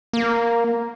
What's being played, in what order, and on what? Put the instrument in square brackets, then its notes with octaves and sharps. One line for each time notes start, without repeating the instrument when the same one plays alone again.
[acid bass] A#3